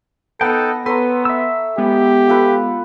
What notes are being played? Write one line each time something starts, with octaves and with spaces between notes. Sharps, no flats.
B3 D#4 A4 F#5 G5 A5 A#6
B3 A4 B4 C#5 A#5 C6
E5 E6
G#3 B3 G4
F4 A4 B4